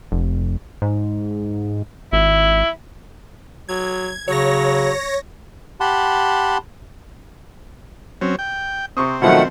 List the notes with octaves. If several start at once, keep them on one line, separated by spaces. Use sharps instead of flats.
F1
G#2
G#1 E4
F#3 G#6
C#3 F#3 C#5 A#6
G4 F#5 A5 B5 C6
F#3 C4 C#4
G5
C3 C4 C#6 D#6
B2 D#3 F3 F#3 A3 F#5